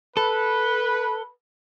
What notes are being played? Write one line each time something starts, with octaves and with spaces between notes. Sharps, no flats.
A4 B4